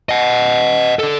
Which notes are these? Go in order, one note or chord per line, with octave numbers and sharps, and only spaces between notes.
D#5 F#5
D3 A4